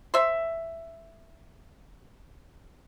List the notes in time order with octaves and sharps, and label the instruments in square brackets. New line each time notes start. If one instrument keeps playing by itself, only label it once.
[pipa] C5 E5